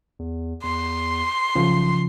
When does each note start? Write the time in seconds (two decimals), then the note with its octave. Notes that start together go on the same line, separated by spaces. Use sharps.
0.19 E2
0.63 E2 C6
1.55 B1 C#3 F3